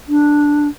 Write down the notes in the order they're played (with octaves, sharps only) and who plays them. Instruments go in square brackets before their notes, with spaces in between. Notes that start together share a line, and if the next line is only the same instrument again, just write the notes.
[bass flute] D4